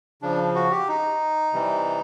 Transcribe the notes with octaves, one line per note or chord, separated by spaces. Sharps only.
C#3 F3 D4
F#4
G4
D#4
C3 E3 G3